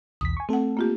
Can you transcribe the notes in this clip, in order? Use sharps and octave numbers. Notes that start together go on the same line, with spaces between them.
B1 E2 D#6 B6
G#5 C#6
A3 C4 A4 F#5
A#3 F4 G4